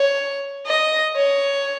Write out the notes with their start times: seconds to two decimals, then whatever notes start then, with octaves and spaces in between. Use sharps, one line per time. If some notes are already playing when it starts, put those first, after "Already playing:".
Already playing: C#5
0.67 D#5
1.16 C#5